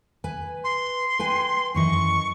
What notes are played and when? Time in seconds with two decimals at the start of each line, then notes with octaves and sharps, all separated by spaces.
0.24 B4 G#5
0.64 C6
1.19 B4 G5 G#5
1.75 F#2 E3 D#5 C#6